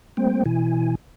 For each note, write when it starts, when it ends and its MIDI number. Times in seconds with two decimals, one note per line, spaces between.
0.17 0.43 55
0.17 0.43 57
0.17 0.43 58
0.17 0.43 60
0.17 0.43 72
0.17 0.43 79
0.46 0.95 47
0.46 0.95 52
0.46 0.95 64
0.46 0.95 80